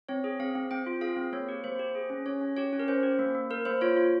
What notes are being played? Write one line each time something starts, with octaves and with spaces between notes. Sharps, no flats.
C4 C#5
G#4
C4 F5
C4
C4 G5
F4
G#4 F5
C4
A#3 C#5
G4
A#3 C5
G4
G#4
C#4
C#4 C#5
C#4
G4 C#5
C#4
A#4
C#4 C5
G4
A#3
A#3
A#3 A#4
A#3 C5
F4 C#5
F4